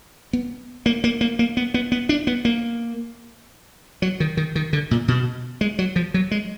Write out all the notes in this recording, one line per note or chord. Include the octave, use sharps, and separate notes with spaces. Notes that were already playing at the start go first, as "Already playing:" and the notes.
B3
A#3
A#3
A#3
A#3
B3
B3
B3
D4
B3
A#3
F#3
D#3
D#3
D#3
D3
A#2
B2
G#3
F#3
F3
F#3
G#3